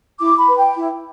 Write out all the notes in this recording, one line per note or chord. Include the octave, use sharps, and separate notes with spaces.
E4 D6
B5
B4
G5
E4